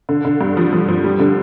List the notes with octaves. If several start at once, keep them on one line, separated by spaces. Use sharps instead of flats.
D3
D3
G2
F3
F3
F3
G3
D3